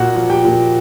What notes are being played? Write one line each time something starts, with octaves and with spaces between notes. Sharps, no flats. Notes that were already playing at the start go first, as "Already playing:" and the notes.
Already playing: A#2 F#4 F#5
F3
G4 G5
A#2